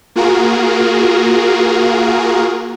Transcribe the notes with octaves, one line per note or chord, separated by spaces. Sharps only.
A#3 F4 F#4 G#4 A#4